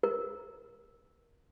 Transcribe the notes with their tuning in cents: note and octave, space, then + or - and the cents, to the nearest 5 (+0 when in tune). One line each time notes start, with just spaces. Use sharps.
A#4 +15